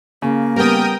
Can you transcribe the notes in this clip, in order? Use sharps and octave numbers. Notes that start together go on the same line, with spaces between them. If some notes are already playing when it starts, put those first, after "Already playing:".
C#3 A#3
G3 B3 A#4 G5 D#6